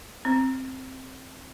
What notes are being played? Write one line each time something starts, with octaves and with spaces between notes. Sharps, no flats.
C4